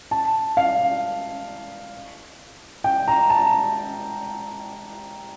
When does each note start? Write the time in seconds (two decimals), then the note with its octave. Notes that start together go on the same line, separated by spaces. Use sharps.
0.11 A5
0.57 F5
2.84 G5
3.08 A#5
3.30 A5